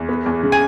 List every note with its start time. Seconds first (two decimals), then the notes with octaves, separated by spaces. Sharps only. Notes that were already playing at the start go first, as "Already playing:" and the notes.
Already playing: E2
0.09 B3
0.26 E2
0.43 C#3
0.52 G#5